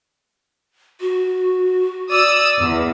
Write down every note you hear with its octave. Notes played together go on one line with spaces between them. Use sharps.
F#4
D5 D#6 E6
E2